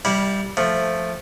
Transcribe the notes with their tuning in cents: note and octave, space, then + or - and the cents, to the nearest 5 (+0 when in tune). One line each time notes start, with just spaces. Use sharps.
G3 +0 E4 -25 F5 +0
F3 +0 A3 +0